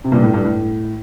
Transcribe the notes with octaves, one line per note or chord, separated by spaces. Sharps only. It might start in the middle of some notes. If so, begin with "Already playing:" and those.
C3
G2 A#2
A2
G2
A2